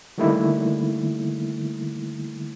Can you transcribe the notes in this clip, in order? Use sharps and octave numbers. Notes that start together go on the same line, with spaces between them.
D3 D#3 G3 A3 A#3 E4